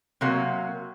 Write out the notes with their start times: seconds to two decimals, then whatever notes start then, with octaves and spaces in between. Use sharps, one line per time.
0.21 C3 F#3 A#3